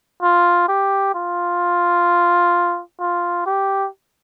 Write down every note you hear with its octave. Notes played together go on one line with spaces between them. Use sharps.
F4
G4
F4
F4
G4